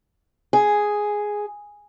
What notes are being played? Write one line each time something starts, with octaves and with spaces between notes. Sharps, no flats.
G#4